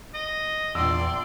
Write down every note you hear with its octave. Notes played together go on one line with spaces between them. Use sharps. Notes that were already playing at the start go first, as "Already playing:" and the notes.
D#5
A#1 E2 D5 C6 E6